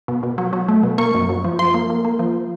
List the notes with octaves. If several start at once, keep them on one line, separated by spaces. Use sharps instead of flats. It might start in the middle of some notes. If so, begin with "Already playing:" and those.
B2
B2
F#3
F#3
A3
B2
A#3 C#6
F#2
F#2
F3
F3 C6
A#3
A#3
A#3
F3